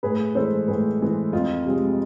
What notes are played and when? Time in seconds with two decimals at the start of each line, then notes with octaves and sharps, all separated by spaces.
0.03 A2 G#4 B4
0.35 E3 G#3 A4 C5
0.68 A2 G#4 B4
1.00 E3 G#3
1.33 F2 F4
1.66 C3 F3 G#3